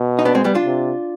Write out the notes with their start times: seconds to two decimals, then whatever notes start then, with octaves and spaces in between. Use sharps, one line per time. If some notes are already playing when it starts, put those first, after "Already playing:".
Already playing: B2
0.19 D#4
0.25 B3 D4
0.35 G#3 C4
0.44 G3 B3
0.55 D4 F4
0.64 C3